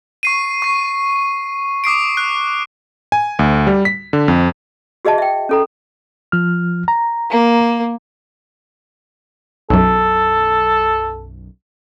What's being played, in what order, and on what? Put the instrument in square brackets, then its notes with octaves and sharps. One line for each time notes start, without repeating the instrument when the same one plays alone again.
[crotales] C#6 C7 D#7
C#6 C7
D6 D#6 C7 D7
F#6
[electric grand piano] G#5
D2
G3
B6
D3
F2
[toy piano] F#4 G#4 D#5 E5 A5
E5 G5
C#4 A4 A#5
[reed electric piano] F3 F6
A#5
[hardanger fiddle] A#3
[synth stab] B1 F#2 [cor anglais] A4